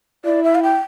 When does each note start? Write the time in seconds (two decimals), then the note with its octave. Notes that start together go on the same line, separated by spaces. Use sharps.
0.25 E4 D5
0.44 E5
0.55 F5
0.63 G5